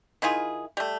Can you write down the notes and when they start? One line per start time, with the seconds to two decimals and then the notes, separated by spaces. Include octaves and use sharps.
0.22 D#3 E4 F4 G#4
0.77 G3 A3